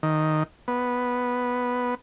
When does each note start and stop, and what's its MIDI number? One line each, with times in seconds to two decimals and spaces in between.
0.03 0.43 51
0.68 1.95 59